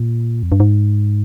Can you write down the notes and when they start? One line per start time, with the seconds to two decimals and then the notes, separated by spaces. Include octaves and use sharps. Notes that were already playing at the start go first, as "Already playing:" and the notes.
Already playing: A#2
0.43 F2
0.52 G2
0.60 G#2